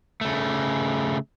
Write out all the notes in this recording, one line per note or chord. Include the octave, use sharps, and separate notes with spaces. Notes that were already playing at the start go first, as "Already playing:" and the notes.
C#3 A3